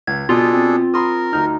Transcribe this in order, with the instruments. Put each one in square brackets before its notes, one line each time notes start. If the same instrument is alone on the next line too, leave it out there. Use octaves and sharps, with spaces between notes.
[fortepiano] C#2 [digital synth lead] G#6
[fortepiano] B2 [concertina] D4 G#4 A4 [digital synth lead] F4
[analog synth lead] C4
[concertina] A#4 [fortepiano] B5 C6 D#6
[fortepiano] D2 F6 [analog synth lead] D#4